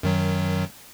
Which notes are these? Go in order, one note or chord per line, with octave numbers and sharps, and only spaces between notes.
F#2 D#3 F#3